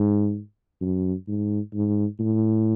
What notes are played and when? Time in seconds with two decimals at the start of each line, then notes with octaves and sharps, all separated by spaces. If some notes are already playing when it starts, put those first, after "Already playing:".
Already playing: G#2
0.81 F#2
1.28 G#2
1.73 G#2
2.19 A2